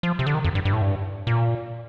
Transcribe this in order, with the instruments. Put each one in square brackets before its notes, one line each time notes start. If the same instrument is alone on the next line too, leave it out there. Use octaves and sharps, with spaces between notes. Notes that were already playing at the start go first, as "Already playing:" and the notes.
[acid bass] F3
C3
D3
D#3
F2
G2
G2
A2
G2
A#2